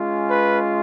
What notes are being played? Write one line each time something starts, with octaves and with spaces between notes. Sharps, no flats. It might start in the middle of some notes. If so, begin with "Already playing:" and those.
Already playing: G#3 C#4 F4
B4